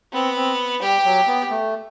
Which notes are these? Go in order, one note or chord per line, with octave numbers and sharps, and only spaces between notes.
B3 C4
C4
G3 G4
F#3
B3
A3